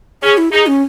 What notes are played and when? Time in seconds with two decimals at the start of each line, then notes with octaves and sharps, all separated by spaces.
0.23 C#4 G#4
0.38 E4
0.52 D#4 G#4
0.67 C#4